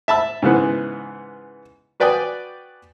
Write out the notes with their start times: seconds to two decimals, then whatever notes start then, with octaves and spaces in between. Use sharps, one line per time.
0.08 E5 A5 B5 E6
0.42 G#2 C#3 E3 B3
2.00 F#4 B4 D5 G5 G#5 D#6